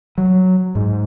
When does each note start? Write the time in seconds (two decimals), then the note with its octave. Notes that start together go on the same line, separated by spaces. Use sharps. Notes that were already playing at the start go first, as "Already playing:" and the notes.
0.18 F#3
0.75 G#2